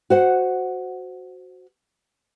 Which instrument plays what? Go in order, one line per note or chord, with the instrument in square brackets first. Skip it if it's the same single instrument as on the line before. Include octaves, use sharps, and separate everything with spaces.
[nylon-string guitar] F#4 C5 F#5